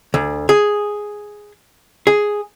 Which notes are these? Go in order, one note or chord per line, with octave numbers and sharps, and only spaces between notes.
D2
G#4
G#4